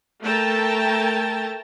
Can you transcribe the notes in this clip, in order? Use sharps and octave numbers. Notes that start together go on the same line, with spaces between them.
A3 A#4 G5 A5 A#5